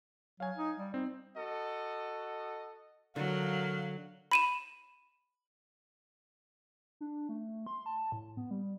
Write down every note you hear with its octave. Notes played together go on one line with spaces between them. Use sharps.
F#3 F5 G#5
D#4
G3
G3 C4 D#4
F#4 A4 D#5
D3 F#3 A#4 F5
B5 D#7 E7
D4
A3
C6
A5
A2
B3
G3